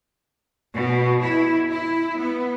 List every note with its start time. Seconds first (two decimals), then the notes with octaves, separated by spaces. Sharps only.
0.73 B2
1.22 E4
1.70 E4
2.17 B3